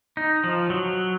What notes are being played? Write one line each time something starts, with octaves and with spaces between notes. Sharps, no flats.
D#4
F3
F#3